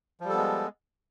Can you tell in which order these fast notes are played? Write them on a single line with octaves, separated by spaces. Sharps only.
F3 G3 A4 B3 G#3